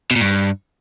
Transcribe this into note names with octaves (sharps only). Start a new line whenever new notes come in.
B2
A#2
G2